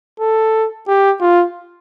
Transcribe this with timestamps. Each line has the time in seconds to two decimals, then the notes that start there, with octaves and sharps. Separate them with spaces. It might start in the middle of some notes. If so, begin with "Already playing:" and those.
0.20 A4
0.88 G4
1.21 F4